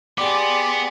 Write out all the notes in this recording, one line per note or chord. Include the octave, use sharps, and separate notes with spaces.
B3 G4 G#4 D5 C6 D6 C#7